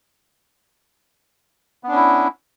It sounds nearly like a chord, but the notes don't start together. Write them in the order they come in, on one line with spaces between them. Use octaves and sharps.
B3 D4 C#4 E4